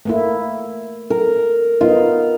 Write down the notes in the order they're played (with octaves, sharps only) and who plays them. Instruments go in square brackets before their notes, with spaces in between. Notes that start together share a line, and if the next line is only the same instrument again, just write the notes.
[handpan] A3 A#3 E4
[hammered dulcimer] A#4
[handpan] B3 D#4 [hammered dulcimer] F4